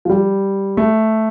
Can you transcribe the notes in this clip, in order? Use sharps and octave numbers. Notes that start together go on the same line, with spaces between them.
F3
G3
A3